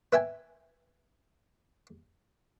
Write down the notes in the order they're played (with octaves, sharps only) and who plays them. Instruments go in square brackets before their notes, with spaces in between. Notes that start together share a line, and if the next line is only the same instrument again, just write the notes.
[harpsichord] B4 E5 G5 G#5